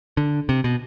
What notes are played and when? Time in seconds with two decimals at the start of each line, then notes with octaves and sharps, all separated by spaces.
0.17 D3
0.49 C3
0.64 B2